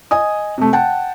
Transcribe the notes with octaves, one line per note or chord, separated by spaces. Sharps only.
D#5 G#5 D#6
C3 A3
F#5 G5 A5